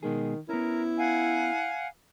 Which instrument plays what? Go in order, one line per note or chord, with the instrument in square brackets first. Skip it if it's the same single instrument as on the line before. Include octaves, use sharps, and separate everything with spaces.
[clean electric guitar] B2 G#3 G#4 [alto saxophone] D#3
[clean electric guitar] B3 C#4 [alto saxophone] E4 [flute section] A#4
[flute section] F5 F#5 G#5